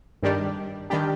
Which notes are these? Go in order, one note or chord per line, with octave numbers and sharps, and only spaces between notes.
G2 D#3 G3 D4 G4
D#3 G3 D4 G4